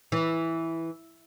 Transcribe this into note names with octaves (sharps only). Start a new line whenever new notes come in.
E3